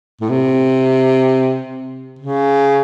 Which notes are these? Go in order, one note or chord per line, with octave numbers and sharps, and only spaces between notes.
A2
C3
C#3